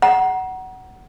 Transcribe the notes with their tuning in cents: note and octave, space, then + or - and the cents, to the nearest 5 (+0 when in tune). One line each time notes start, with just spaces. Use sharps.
F#5 +15 A#5 +30